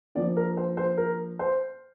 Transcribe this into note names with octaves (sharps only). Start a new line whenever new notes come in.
F3 A#3 D4 D5
A#4
C5
C5
A#4
C5